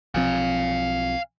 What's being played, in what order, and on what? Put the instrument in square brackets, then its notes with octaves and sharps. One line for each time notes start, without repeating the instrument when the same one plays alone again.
[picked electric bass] B1 F3 C4 [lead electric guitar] F5 G#5